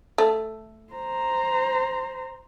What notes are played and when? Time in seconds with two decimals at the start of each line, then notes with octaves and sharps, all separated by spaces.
0.18 A3
0.94 C5 A#5